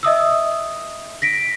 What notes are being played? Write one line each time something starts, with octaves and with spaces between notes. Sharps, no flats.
D#5 E5 D#6 E6
A#6 B6 D7